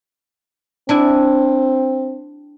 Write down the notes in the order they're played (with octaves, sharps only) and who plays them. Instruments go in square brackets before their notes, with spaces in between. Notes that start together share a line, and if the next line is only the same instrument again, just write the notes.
[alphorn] C4 [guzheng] D4 E4 G#5